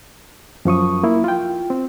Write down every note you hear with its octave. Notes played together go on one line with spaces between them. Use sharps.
F#2 F3 C#6 D#6
A#3 E4
F4 G5
C4